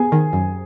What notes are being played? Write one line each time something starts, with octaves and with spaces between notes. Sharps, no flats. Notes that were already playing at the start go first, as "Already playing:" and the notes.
Already playing: B3 G#4 G#5
D#3
F#2